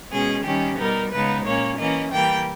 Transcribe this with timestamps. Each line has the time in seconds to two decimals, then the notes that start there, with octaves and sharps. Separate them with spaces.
0.11 B2 G#3 C#4 G#4
0.44 D#3 G3 C#4 G4
0.78 B2 G3 B3 D#4 A#4
1.11 C#3 G#3 B3 D#4 B4
1.44 A#2 A#3 C#4 C#5
1.77 E3 A#3 C#4 D#5
2.11 E3 G3 A#3 G5